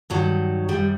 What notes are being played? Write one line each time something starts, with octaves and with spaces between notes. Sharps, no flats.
G2 D#3 F#3
F#2 D#3 G3